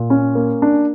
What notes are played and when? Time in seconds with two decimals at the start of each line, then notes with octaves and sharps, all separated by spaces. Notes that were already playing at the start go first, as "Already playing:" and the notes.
Already playing: A#2
0.10 C#4
0.35 A#3
0.62 D4